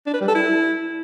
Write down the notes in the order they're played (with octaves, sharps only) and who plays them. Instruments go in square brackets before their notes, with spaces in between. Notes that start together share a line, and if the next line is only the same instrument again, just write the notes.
[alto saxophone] D4
B4
G3
A4
E4